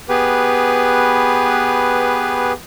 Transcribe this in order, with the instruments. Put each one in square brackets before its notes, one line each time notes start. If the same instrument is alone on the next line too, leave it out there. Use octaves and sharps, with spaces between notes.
[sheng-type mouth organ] B3 G4 G#4 B4